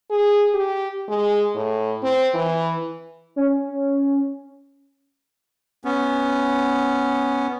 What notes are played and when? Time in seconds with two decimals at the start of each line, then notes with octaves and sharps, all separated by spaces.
0.10 G#4
0.54 G4
1.09 G#3
1.55 A2
2.03 C4
2.35 E3
3.36 C#4
5.85 B3 C#4